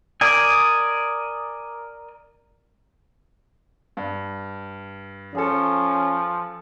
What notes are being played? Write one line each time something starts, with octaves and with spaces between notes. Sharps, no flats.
A#4 D5 D#5 G#5
G2
F3 C#4 G#4 A4